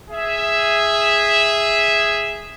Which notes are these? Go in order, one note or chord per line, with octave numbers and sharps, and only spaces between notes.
G#4 E5